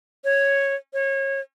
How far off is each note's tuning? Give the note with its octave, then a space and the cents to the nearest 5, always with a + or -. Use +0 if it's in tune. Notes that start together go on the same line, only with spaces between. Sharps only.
C#5 -5
C#5 -25